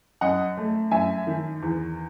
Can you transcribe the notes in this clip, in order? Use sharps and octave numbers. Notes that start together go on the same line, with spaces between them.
F#2 D#5 F#5
A3
F#2 E5 G#5
D#3
E2